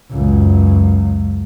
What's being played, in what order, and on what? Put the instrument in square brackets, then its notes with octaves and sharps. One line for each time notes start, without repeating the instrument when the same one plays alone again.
[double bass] C#2 F#2